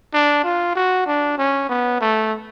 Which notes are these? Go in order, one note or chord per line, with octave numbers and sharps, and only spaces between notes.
D4
F4
F#4
D4
C#4
B3
A3